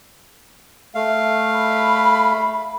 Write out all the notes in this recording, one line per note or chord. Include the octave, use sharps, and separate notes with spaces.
A3 F5
B5